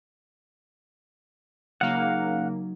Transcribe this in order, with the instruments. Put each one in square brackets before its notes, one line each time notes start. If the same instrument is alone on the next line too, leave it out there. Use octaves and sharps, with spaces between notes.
[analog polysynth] C#3 A#3 [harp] F#3 D#4 [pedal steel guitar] F5 F#5